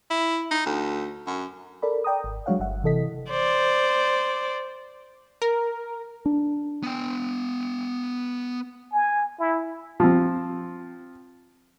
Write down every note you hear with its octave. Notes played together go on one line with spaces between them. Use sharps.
E4
D#4
D2
F#2
A4 A#4 D5 B5
D5 G5 A#5 D#6
G#1
F#3 G#3 D4 C#5 F5 F#5
G1 E5 F#5
C3 E3 A4 D#5 B6
C5 D5
A#4
D4
B3 G5
G#5
E4
F3 C4